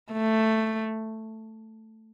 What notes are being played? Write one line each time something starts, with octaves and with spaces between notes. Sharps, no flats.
A3